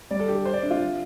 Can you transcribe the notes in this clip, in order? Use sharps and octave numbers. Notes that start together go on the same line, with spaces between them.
G3 D5
A4
D3 G4
A4
D3 C5
D5
D3 D4
F4
C3